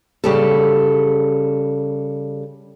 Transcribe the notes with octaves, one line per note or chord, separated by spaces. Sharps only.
C#3 G3 A4